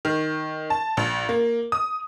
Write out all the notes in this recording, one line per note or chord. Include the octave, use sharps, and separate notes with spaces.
D#3
A5
A#1
A#3
D#6